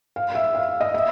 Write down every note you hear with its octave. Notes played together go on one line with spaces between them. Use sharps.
F5
E5
F5
D#5
E5